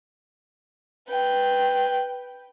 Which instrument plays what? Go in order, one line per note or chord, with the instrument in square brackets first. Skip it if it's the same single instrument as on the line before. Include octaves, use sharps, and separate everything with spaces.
[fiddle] B4 G5